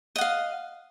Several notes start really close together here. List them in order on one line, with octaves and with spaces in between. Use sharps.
D#5 F#5 F5